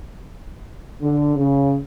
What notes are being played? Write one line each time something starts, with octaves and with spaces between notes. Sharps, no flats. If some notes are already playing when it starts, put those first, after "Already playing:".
D3
C#3